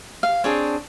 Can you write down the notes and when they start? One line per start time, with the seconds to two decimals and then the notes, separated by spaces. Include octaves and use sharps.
0.23 F5
0.44 C4 D4 G#4 C#5